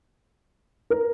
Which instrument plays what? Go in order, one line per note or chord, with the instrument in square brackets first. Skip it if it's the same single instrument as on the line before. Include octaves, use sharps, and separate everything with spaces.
[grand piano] A#4